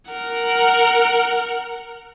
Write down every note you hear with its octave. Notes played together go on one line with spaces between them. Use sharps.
A#4 F#5